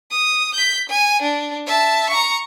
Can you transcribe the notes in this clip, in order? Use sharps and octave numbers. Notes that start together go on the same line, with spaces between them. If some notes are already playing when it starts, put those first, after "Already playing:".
D#6
G6 B6
G#5
D4
E5 A5
A#5 C#6